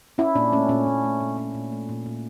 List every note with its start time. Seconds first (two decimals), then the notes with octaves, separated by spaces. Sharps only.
0.18 C#4 E4
0.35 A#2 D4
0.52 A3 C#4
0.69 A#2 C#4
0.86 A#2
1.04 A3
1.21 A#2
1.37 C#4
1.55 A#2
1.72 A3
1.89 A#2
2.06 A#2